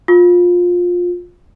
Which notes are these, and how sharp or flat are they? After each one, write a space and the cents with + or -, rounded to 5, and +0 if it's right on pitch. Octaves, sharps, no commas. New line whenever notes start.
F4 +20